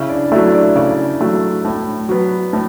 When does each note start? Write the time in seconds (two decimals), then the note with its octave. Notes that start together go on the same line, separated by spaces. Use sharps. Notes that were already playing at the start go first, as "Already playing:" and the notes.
Already playing: C#3 E4 E5
0.09 D4 D5
0.32 F#3 A3 E4 E5
0.54 D4 D5
0.76 C#3 D4 D5
1.21 F#3 A3
1.64 A2
2.09 F#3 B3
2.53 A2